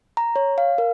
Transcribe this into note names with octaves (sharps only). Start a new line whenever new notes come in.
A#5
C#5
F5
A#4